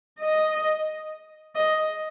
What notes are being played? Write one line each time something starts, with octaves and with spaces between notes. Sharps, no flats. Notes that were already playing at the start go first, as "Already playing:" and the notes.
D#5
D#5